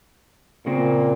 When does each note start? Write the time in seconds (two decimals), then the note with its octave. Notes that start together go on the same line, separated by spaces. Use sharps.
0.66 A#2 C#3 A#3 C4